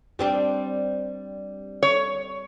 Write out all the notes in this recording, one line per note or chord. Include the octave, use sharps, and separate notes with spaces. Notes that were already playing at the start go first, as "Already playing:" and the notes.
G3 C4 D4
C#5